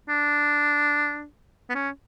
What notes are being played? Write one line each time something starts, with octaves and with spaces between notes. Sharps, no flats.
D4
B3
C#4